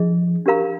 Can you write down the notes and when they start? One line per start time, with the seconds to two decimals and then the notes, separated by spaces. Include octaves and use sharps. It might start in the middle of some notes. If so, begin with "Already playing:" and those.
Already playing: F3 D4 G#4 D#5
0.46 D4 G4 A#4 F5 A#5